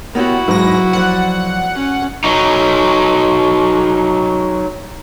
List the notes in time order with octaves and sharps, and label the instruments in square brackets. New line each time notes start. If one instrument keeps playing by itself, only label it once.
[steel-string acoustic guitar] B3 G4 C#5 [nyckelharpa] E4 F#4 [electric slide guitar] A#4
[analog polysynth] G#2 A#6 [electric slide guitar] F#3 [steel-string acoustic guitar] B4
[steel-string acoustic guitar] F3 D5 [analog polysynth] F#5
[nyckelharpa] C#4
[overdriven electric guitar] F#3 D#4